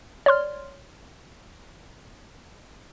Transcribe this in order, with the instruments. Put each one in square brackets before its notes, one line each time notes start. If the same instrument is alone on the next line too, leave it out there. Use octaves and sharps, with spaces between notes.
[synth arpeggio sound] C#5 D5 C6 F6